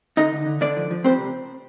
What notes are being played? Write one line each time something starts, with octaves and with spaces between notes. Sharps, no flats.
D3 D#4 D#5
D3
D3
D3 D4 D5
F3
F3
G3 C4 C5
C3